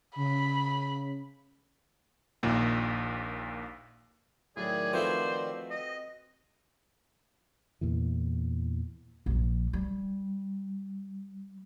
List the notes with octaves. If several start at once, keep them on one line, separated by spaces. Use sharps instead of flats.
C#3 B5
A#1 D#2 A#2
A2 D#3 F#3 G#4 D5 A6
F3 A3 C4 E4 F#4 B4 C5
D#5
E2 A#2 E3
A#1 F3
G3